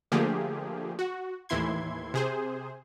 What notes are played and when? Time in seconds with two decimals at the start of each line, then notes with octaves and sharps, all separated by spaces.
0.12 D3 F3 A3 A#3 G4 G#4
0.99 F#4
1.49 D#2 A2 E3 E4 C6 G#6
2.14 C3 G#4 C5